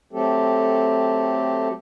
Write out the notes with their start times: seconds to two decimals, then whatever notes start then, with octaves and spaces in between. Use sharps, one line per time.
0.13 F#3 A3 C4 G4 A4